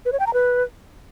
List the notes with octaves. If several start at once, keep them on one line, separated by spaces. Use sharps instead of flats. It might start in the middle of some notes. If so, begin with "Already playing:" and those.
B4
C#5
G5
A#5
B4